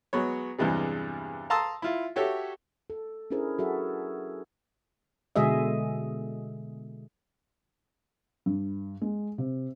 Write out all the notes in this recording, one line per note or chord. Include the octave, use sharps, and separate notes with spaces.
F#3 G#3 B3 C#5
E2 G2 C3 E3 G3 G#3
F5 A5 A#5 C6 D#6 E6
E4 F4
F#4 G4 A4 C#5 E5
A4
C#4 D4 E4 G#4 A#4 C5
F#3 F#4 G#4 A4 E5
B2 D3 G#3 G#4 D#5 E5
G2
G#3
C3